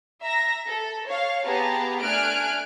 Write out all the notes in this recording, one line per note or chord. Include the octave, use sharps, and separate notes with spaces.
E5 A#5 A#6
A4
C#5 F5
B3 G4 G#4 A5 A#5
A3 D4 G#5 F6 F#6 D7